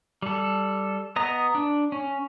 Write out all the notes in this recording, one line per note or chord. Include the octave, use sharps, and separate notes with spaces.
G3 A4
B3 D#5 A#5
D4
C#4